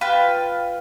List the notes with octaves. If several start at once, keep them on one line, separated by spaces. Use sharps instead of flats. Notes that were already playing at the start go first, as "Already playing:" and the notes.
F4 B4 G5 F#6